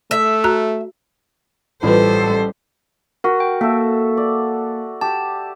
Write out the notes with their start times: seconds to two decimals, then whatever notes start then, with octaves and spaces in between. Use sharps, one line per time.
0.11 A3 E5
0.44 F#4 A#5 F#6
1.83 A1 G3 F4 A4 B4 C5
3.24 F#4 A#4
3.40 G5
3.61 A#3 A4 E5
4.17 D5
5.01 G4 A5